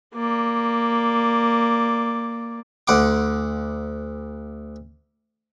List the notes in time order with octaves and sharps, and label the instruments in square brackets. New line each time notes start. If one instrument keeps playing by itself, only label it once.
[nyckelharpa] A#3 D5
[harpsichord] D2 F#5 C6 D6